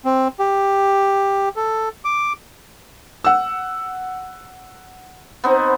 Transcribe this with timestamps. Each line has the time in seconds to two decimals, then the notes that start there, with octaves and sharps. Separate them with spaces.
0.05 C4
0.39 G4
1.56 A4
2.05 D6
3.24 F#5 E6
5.44 B3 C4 D#4